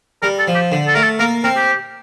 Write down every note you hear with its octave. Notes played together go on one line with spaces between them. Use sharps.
G3 A#4
A4
F3
G4
D3
A4
A3 A#4
A4
A#3 A#4
C4 A#4
G4